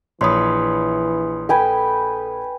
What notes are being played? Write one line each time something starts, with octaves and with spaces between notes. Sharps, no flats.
A#1 E3 C#5 B5 C6 D#6
A4 B4 G5 G#5